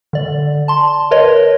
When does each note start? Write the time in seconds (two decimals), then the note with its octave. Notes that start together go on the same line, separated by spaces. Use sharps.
0.13 D3 D5
0.68 A5 C6
1.11 A#4 B4 C#5 D#5